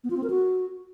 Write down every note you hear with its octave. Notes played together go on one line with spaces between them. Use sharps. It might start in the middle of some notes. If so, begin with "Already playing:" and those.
B3
F4
C4
A#4
F#4